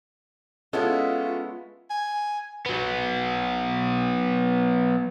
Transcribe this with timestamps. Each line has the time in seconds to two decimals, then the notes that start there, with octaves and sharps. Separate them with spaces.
0.73 G#3 B3 C#4 E4 F4 A4
1.90 G#5
2.66 F#3 B3